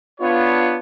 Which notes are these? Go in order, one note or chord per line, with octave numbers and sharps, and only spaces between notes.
B3 D4 F4 C#5